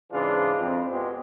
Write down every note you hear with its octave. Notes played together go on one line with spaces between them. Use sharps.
G#2 C#3 E3 D4 F4 G#4
F2
B2 G#3 G4